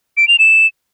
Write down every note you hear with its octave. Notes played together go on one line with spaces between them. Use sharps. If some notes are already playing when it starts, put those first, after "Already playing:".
D7
F7
E7